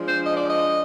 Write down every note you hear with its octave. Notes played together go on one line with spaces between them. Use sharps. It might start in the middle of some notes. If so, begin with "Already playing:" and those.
Already playing: F3 G#3 D4
C5
D#5
D5
D#5